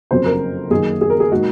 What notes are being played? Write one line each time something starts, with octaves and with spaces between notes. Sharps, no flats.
F#1 F2 C#3 F#3 C4 C5
A#4
F#2 D#3 A#3 G#4
G#4
A#4
G#4
A#2 G#3 D#4 F#4